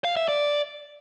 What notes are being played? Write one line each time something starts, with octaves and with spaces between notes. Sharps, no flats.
F5
E5
D5